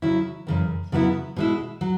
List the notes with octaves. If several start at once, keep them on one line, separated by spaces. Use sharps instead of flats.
C#3 F#3 E4
F#2 C#3 E3
C#3 F#3 B3 E4
B2 G#3 E4
F#3